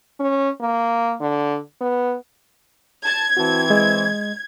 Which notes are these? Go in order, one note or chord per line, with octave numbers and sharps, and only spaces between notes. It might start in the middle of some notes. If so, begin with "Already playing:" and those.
C#4
A#3
D3
B3
A5 G#6
E3 C4 F#4 A5
G#3 D#5